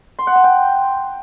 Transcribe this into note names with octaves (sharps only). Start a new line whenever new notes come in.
C6
F#5
A5
G5